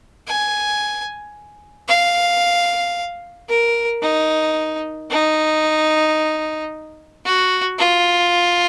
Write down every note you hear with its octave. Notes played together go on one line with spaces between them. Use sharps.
G#5
F5
A#4
D#4
D#4
F#4
F4